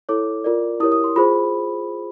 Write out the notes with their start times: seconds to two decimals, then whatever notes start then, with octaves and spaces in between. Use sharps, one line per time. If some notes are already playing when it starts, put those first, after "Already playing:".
0.09 E4 A4 C#5 D6
0.44 F4 A#4 D5
0.80 E4 G4 A#4 C#5 D#6
0.92 D#6
1.04 C6
1.16 F4 G#4 C5 B5